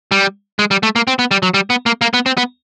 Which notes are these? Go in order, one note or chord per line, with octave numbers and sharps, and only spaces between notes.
G3
G#3
G3
A3
A#3
C4
B3
G3
F#3
G3
B3
A#3
A#3
B3
C4
B3